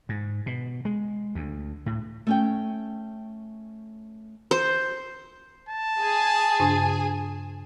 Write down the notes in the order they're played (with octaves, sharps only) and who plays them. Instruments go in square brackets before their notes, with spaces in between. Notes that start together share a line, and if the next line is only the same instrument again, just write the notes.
[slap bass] G#2
B2
G#3
D2
A2
[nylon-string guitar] A3 C#4 G5
[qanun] C5
[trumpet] A5
[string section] G#4 G#5
[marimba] G2 C#3 D4